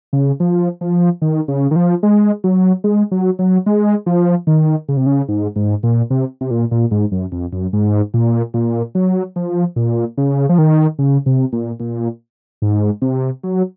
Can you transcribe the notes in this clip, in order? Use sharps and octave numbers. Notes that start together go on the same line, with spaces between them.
C#3
F3
F3
D#3
C#3
D#3
F3
G#3
F#3
G#3
F#3
F#3
G#3
F3
D#3
C#3
C3
C#3
G#2
G#2
A#2
C3
C3
A#2
A#2
G#2
F#2
F2
F#2
G#2
A#2
A#2
F#3
F3
A#2
C#3
F3
D#3
C#3
C3
A#2
A#2
G#2
C3
F#3